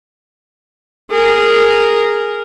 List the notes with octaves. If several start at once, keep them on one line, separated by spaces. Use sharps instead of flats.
G#4 A#4